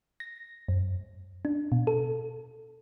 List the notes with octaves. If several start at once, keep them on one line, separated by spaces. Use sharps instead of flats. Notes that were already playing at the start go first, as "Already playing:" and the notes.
A#6
F#2
D4
B2
A4